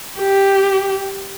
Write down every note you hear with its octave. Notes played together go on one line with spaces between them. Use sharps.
G4